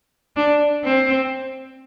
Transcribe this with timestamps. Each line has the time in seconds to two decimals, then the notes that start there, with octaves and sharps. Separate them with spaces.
0.36 D4
0.84 C4